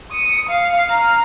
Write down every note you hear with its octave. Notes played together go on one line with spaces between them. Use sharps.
D#6 C#7
F5
A#5 F6